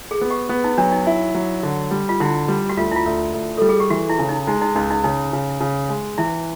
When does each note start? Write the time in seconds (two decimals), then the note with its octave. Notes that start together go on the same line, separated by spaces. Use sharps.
0.11 G#4
0.21 B3
0.30 G4
0.49 B3
0.64 D#4
0.78 F#3 D4
0.92 D#4
1.07 E4
1.35 F#3
1.63 D3
1.91 G3
2.09 F4
2.20 D3 E4
2.48 G3
2.69 F#4
2.77 D2 F4
2.91 E4
2.96 F4
3.06 D2
3.34 D2
3.58 G3 A4
3.69 G#4
3.80 G4
3.90 E3 F#4
4.09 E4
4.19 C#3
4.29 D#4
4.47 G#3 D#4
4.62 D#4
4.75 C#2 D#4
4.91 D#4
5.04 C#3 D#4
5.33 C#3
5.61 C#3
5.89 G#3
6.18 E3 E4